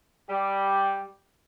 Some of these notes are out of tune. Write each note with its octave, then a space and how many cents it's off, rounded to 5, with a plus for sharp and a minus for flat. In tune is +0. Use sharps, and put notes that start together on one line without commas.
G3 +0 G4 +0